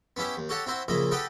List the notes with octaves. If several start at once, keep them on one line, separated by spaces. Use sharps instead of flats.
B3 C#4 E4 G4
D#2
F#4 G4 A4 C#5 F#5
C4 E4 F#4 C5
A#1 A#2 C#3 E4 D#5
G4 A4 B4 D#5 F#5 G5